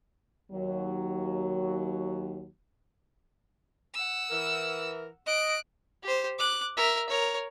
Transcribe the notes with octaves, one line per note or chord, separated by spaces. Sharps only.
D#2 F#3
F#5 E6
E3 A#4
D#5 F#6 D7
G4 C5
D6 F#6
A#4 E5
A#4 C#5